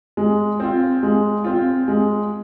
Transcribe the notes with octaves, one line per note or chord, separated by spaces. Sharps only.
G#3
C4 F4
G#3
C4 F4
G#3